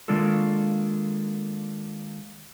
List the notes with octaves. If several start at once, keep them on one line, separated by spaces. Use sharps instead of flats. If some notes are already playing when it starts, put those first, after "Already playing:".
D#3 G#3 A#3 D4 F4 A4